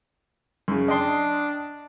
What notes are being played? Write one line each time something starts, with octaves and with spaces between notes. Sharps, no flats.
F#2 C#3
D4 D#5 G5 C6